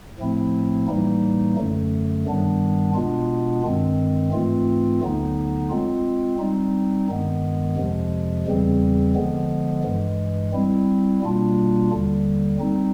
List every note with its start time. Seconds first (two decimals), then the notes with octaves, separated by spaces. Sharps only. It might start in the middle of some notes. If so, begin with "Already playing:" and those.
0.19 A2 F3 A3 C4 E4
0.87 A2 E3 G3 A#3 D#4
1.56 F#2 D3 F#3 A3
2.26 G2 D#3 G3 B3 D4
2.94 B2 G#3 B3 D4 F4
3.64 G2 D#3 G#3 C4
4.32 G#2 E3 A3 C4 F4
5.01 D2 D3 F#3 B3 D#4
5.69 G#3 C4 F4
6.39 G3 C4 D#4
7.08 G2 D#3 G#3 B3
7.76 F2 C3 F3 G#3
8.46 E2 C#3 E3 G3 C4
9.15 D3 F3 G#3 B3
9.83 G2 E3 G#3
10.53 G3 C4 E4
11.22 B2 G3 A#3 D4 F4
11.90 D#2 D3 G3
12.59 G3 C4 D#4